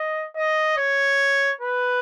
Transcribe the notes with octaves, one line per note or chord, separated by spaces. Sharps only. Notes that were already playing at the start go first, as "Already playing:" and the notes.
Already playing: D#5
D#5
C#5
B4